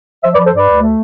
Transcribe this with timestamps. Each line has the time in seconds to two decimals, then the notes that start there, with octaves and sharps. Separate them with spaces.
0.24 F3 C5 E5
0.34 B4 D5
0.38 F3
0.46 A4 C5
0.52 G2 B4 D5
0.68 D2
0.82 A3